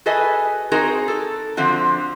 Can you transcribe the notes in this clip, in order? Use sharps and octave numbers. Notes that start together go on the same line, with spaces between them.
F#4 G#4 A4 B4 D#5 G#5
C4 D#4 F#4 G#4 A#4
A4
D3 F3 C4 F#4